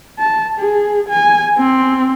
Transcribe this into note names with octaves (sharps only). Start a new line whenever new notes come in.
A5
G#4
G#5
C4